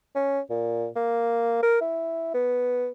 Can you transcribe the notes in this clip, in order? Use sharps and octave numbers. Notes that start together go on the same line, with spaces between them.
C#4
A#2
A#3
A#4
E4
B3